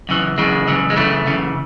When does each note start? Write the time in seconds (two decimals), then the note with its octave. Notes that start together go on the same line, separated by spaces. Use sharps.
0.09 F#2 C#3 E3
0.38 F#2 C#3 E3 G#3
0.68 F#2 C#3 E3
0.90 G#3
0.96 F#2 C#3 E3 A3
1.26 F#2 C#3 E3